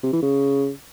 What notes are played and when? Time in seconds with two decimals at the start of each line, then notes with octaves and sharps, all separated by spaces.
0.03 C3
0.13 E3
0.22 C#3